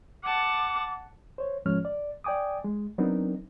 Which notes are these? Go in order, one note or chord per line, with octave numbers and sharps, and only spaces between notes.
F#5 A5 D6
C5 C#5
G#2 F3 G#3 C#4 C#5 F6
D5
D5 G5 G#5 D6 D#6
G#3
F#3 B3 C4 D4 D#4 A#4